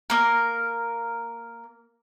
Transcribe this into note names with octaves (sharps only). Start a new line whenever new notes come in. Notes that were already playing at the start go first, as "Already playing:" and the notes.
A#3 A#4